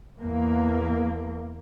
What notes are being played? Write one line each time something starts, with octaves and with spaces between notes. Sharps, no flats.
E2 A#3